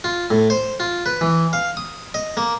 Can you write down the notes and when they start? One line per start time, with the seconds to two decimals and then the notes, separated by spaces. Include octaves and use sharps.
0.04 F4
0.31 A2
0.50 C5
0.80 F4
1.06 B4
1.21 E3
1.53 F5
1.77 D#6
2.14 D#5
2.37 A#3